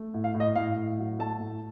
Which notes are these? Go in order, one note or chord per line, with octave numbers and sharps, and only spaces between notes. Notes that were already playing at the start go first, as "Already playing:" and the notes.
Already playing: A3
A2
F5
A2
D#5
A2 F5
A2
F#3
A3 A5
A2